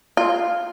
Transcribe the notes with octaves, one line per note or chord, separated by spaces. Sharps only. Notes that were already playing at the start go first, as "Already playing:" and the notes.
F4